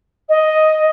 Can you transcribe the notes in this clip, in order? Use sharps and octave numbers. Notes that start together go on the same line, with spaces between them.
D#5